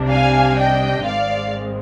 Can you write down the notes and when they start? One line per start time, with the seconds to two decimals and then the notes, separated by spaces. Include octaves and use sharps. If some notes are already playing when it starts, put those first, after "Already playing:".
Already playing: C2 C3 G3 D4
0.09 F5 G#5
0.58 D#5 G5
1.05 G#1 G#2 D#3 G#3 C4 D5 F5